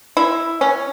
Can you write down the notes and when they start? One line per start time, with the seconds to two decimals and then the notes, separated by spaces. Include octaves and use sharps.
0.17 E4
0.61 C#4